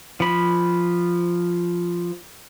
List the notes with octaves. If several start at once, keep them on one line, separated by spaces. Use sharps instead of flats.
F3 B5